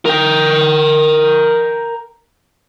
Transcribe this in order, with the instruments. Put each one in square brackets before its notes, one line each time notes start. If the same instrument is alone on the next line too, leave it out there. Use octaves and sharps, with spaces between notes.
[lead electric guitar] A#4 G5